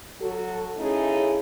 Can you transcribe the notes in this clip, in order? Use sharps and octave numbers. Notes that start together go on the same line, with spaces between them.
F#3 F#4 A4
C#3 A3 C#4 D#4 E4 G#4